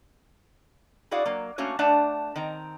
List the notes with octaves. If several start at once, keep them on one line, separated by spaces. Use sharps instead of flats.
E4 F#4 G#4 D5 F5 F#5
F#3 A#3
A3 A#3 C#4 F#4 C#5
A3 D4 D5 F#5 A5
D#3 C4 A#5